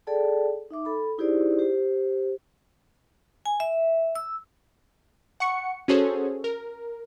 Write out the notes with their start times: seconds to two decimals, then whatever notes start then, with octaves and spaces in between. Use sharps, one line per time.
0.07 G#4 A4 D5 G5 A5
0.71 D#4 E5 D6
0.85 A4 B5
1.18 D#4 E4 G4 G#4 C5 D5
1.59 G4 C5
3.46 G#5
3.60 E5
4.15 E6
5.40 F#5 C#6 C#7
5.88 C#4 F#4 G#4 A4 C5 C#5
6.44 A#4